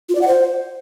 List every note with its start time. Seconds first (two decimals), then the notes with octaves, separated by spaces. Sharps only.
0.09 F4
0.15 D5
0.21 F#5
0.28 C5